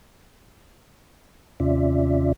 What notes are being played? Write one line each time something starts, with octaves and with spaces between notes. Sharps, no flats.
D#2 C3 C#4 F4 D5 E5